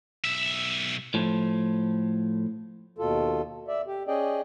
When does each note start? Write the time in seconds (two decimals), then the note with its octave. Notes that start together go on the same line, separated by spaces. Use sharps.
0.24 B1 E5
1.14 A2 F3
2.98 D#2 B2 F4 A4
3.68 D5 E5
3.87 G4
4.08 C#4 G#4 D5 D#5 G5